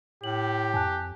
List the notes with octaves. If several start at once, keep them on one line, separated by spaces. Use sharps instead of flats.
A2 G4 F#7
F2 G#5 A5 F#6